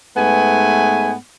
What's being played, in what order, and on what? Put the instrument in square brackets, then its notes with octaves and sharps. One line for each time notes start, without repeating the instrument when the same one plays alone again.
[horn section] G#2 A3 B3 B4 G#5